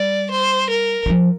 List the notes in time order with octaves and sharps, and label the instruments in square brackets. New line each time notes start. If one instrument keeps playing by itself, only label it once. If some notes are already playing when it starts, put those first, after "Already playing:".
Already playing: [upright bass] G3 [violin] D5
[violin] C5
A#4
[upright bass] E3
F3